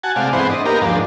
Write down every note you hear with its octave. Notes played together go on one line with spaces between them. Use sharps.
F#4 F#5 G#5 A5
C3 G#3 A3 D5 F5
G#2 E3 B3 C4 C5 F#5
D4 D#5
A#3 B3 D#4 G4 A#4
D#2 G#2 F3 D4